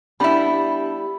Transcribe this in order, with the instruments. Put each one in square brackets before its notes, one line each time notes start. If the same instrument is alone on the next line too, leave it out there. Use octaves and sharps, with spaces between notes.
[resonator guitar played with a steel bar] G3 B3 E4 [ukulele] D4 B5 [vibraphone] G4